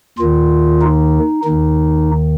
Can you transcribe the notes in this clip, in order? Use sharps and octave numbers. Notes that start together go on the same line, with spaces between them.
D#2 D#3 F4
D#4
D#2 D#3 D#4